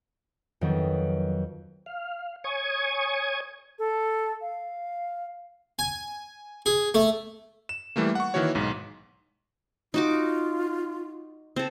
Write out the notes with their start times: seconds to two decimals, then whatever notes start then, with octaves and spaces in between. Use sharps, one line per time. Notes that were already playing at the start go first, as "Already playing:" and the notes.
0.61 F2 D#3 F#3 B3
1.86 F5
2.44 C#5 G#5 C#6 D#6 G#6
3.79 A4
4.41 F5
5.79 G#5
6.66 G#4
6.94 A3
7.69 E7
7.96 E3 G3 A3 A#3
8.15 F#5 C#6
8.34 D#3 E3 A#3 F#4 C#5
8.55 B1 G#2
9.94 D#4 F4 F#4 D6
11.56 C4 A4